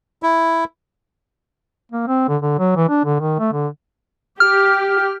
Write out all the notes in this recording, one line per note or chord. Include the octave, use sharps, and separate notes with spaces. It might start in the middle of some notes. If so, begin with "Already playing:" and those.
E4
A#3
C4
D3
D3
F#3
E3
D4
D3
D#3
A3
D3
G4 F6